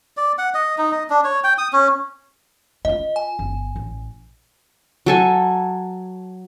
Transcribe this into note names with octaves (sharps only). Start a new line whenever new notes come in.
D5
F#5
D#5
D#4
D#5
D4
C#5
G5
D#6
C#4
E4 F4 D#5
G#5
G1
A1
F#3 A4 G#5